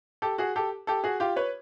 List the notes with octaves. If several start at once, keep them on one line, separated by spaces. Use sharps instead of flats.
G4 A4
F#4 G#4
G4 A4
G4 A4
F#4 G#4
F4 G4
B4 C#5